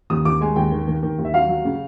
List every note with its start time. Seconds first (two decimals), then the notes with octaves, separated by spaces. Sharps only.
0.10 D#2 D#6
0.25 D#2 D6
0.41 G#3 G#5
0.56 D#2 G5
0.72 D#3
0.88 D#3
1.03 D#3
1.19 D#2
1.25 E5
1.34 F#3 F5
1.49 F#3
1.65 C#3